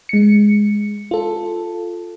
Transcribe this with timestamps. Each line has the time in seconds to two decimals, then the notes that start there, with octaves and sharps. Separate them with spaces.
0.09 G#3 C#7
1.11 F4 A4